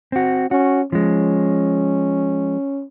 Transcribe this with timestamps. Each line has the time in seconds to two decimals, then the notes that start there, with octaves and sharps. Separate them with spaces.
0.12 C4 F#4
0.51 C#4 F#4
0.92 F3 G#3 C#4